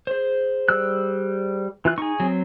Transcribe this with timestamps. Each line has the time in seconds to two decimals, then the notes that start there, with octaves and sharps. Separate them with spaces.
0.07 G#4 C5
0.69 G3 E6 F#6
1.85 E3 F4 F#6
1.98 D#4 G#4 C#6
2.20 F#3 C4